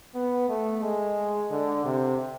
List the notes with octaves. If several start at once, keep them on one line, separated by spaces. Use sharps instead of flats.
B3
A3
G#3
D3
C3